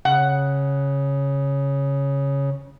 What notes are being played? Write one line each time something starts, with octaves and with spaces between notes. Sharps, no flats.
C#3 F#5